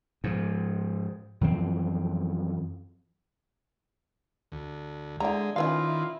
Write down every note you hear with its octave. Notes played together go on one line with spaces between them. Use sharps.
G#2 F3
F#2 E3 F3 C4
D2
D3 G#3 E4 A#5
D#3 C#4 E4 F4 B4 F5